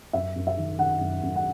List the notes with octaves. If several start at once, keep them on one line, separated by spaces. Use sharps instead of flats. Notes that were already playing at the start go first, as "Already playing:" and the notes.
F#2 E5
F#2
E5
D#3
D#3 F#5
F#2
F#2
F#5